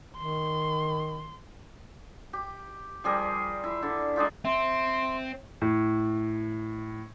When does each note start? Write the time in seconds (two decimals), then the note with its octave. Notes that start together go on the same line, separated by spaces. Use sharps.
0.17 D#3 C6
2.33 G4
3.04 F3 G3 G#4 A#4
3.64 E4
3.82 D3
4.16 G#3 D4 D#4 F4
4.45 C4 E5 C6
5.62 A2